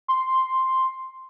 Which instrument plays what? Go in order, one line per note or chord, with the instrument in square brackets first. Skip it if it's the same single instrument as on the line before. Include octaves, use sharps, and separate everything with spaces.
[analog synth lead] C6